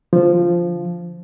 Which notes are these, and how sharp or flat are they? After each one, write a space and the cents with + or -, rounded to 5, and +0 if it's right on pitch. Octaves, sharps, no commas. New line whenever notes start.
D3 -5 F3 -5